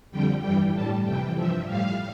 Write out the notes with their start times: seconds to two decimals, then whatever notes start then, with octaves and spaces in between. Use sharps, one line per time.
0.11 F2 D3 G3 G5
0.42 G2 E3 G3 G5
0.73 A2 G3 A5
1.04 F2 C3 E3 G5
1.35 G2 F3 E5
1.66 A2 G3 F5